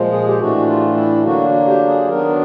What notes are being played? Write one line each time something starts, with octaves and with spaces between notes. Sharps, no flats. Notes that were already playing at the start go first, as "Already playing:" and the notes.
Already playing: A#2 F3 G#3
G#4
G4
A2 E3 A3 D4 F#4
F4
E4
D3 F#3 A#3 D4 F#4
G4
G#4
D#3 F#3 B3 D4 A#4